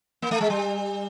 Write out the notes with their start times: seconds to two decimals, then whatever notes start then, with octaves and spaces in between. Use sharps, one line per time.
0.22 A#3
0.31 A3
0.41 G#3
0.50 G3